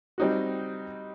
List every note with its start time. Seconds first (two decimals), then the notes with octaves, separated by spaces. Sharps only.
0.18 G3 C4 D#4 F#4